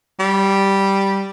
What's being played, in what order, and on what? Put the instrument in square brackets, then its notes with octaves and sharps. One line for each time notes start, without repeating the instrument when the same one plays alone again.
[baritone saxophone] G3